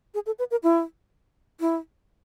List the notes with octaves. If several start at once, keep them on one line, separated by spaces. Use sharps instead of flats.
G#4
A4
B4
A#4
E4
E4